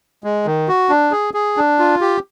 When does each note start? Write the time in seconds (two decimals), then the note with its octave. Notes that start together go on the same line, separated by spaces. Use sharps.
0.24 G#3
0.46 D#3
0.68 F#4
0.89 D4
1.12 G#4
1.34 G#4
1.57 D4
1.79 F4
2.01 G4